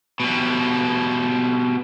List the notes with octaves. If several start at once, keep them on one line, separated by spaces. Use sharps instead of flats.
B2 G3